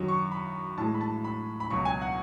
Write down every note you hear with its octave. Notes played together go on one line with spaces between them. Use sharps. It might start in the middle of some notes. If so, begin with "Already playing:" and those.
Already playing: F#2 D#3 F#3
C#6
B5
A2 E3 G#3 A5
B5
A5
B5
B5
C#2 B2 F#3 C#6
G#5
F#5